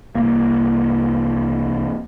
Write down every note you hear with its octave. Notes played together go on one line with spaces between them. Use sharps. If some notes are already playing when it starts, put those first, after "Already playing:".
C2 A#3